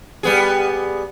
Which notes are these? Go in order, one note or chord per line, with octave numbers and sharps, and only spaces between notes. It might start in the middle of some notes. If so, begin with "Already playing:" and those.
G3 B3 G#4